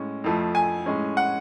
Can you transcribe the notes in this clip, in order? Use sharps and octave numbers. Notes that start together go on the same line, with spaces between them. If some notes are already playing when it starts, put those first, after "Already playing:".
Already playing: A2 G#3 C#4
F2 F3 A3
G#5
A2 G#3 C#4
F#5